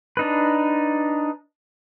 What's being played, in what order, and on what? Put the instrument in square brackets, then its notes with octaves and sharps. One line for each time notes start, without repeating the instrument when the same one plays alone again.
[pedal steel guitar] D4 D#4 B4